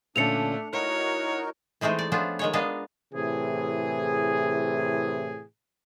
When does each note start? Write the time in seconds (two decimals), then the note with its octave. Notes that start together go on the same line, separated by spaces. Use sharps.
0.16 A#2 D3 A3 C#4 D4 C#7 F7
0.73 D#4 E4 F#4 A#4 C#5
1.81 E3 G#3 A3 C4 D#4
1.99 D5
2.12 F3 B3 C#4 D4 F4
2.39 D#3 G#3 C#5
2.53 G#3 A#3 B3 D4 D#5 F5
3.14 A2 C3 E3 G#4